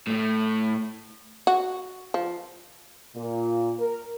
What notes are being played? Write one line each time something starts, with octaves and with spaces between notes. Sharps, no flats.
A2 A3
F#4
F3
A#2
A#4